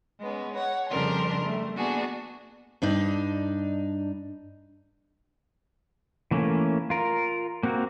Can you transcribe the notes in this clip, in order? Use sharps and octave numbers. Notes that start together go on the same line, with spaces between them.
G#3 B3 C#4
C#5 F#5
F2 C#3 G3 D4 A#4 C6
G3 A3
A#3 B3 D4 F#4 G#4
G2 D4 D#4
E3 A3 A#3 C#4
F4 A#4
A#3 C4 F#4